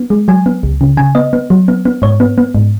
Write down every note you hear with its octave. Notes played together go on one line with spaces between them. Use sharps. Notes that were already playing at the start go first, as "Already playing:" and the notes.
Already playing: B3
G#3
F#3 G#5
B3
C#2
C#3
C#3 G#5
B3 D#5
B3
F#3
B3
B3
G#2 C#5
B3
B3
G#2